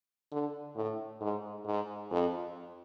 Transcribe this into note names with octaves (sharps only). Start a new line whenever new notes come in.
D3
A2
G#2
G#2
F2